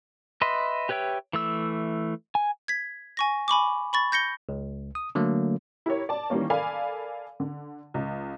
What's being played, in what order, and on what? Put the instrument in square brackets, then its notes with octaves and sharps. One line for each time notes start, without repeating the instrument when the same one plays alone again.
[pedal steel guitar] B4 D#5 E5 C6
G4 B4 C#5 E5 G5
E3 A3 E6
G#5
[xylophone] G#6 B6
G#5 C#6 A#6
G#5 B5 C#6 D6
B5 C#6 A6
G6 A#6 C#7 G7
[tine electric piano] C#2
D#6
D3 F#3 A3 A#3
[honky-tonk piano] E4 G4 A#4 C#5
D5 A5
D#3 E3 G3 A#3 C#4
A4 A#4 D5 F5 G#5 B5
D3
C#2